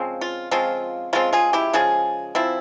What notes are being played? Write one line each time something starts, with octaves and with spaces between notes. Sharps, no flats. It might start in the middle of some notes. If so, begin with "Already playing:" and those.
Already playing: C#3 F3 G#3 C4
F4
C#3 F3 G#3 C4 F4
C#3 F3 G#3 C4 F4
F4 G#4
E4 G4
C#3 F3 G#3 G#4
F3 C4 E4